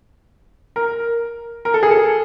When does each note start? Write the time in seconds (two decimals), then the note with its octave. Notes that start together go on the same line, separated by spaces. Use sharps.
0.76 A#4
1.65 A#4
1.74 A4
1.83 G#4
1.91 A4